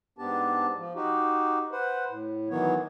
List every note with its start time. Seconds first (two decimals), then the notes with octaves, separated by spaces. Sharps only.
0.18 G#2 B3 D4 G4 A5
0.77 F3
0.95 D#4 F#4 G4
1.72 B4 C5 F#5
2.09 A2
2.50 D#3 E3 F#3 B3 C#5